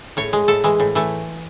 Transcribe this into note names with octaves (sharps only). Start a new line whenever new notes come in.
A2 C#5
G#3
A2 A4
E3 G#3
A2
E3 A3